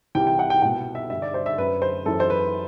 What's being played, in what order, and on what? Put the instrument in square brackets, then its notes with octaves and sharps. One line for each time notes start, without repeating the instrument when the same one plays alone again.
[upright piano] C2 C3 E3 G5
G5
F#5
G5
C2 B2 F#5
E5
G2 D3 E5
D5
C5
E5
F#2 D3 B4
C5
F#2 E3 A4
C5
B4